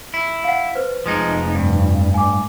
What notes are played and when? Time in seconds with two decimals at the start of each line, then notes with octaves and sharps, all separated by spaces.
0.14 E4
0.44 F5 F#5
0.75 B4 C5
1.06 F1 F3 G#3 D#4
1.55 G2
2.14 A2 G#5 D6